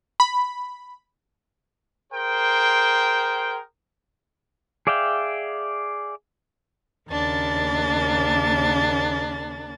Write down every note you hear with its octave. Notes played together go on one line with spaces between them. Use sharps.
B5
G#4 A#4 C5 G5
G#4 D5 E5 F5 G5
D#2 C#3 A#3 D4 A6